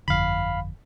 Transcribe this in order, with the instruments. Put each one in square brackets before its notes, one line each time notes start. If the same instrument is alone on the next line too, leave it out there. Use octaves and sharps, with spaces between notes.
[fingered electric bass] G1 F2 D3 [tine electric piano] F5 B5